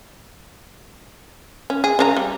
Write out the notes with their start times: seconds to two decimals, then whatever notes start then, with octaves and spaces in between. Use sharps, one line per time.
1.70 C#4
1.84 G#4
1.99 C#3 D4 A#5
2.17 G3